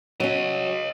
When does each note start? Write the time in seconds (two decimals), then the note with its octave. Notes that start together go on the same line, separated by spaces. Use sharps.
0.20 F#3 C#4 C#5 D#5